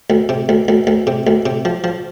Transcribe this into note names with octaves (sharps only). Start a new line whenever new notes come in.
D2
C3
D2
D2
D2
C3
D2
C3
F3
F3